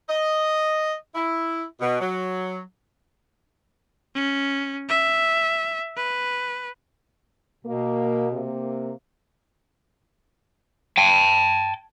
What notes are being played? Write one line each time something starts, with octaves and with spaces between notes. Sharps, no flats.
D#5
E4
B2
F#3
C#4
E5
B4
B2 A#3
C3 A#3
G5 A5